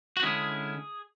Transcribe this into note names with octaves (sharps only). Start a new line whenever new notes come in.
F#4
D3 G#3 C#4 E4 G#4